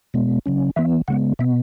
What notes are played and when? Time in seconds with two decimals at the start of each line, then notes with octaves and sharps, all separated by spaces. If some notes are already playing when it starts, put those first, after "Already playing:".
0.14 B2 G#3 B3
0.46 C#3 F#3 C#4
0.76 E3 B3 E5
1.08 C#3 G#3 B3 F#5
1.39 B2 B3 E5